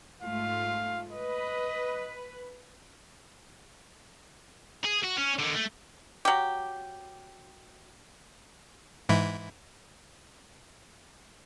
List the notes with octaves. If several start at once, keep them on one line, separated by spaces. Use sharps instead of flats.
G#2 A3 F4 F5
B4 D#5
G#4
F#4
C#4
D3 D#3
A3
F#3 G4
G#2 E3 E4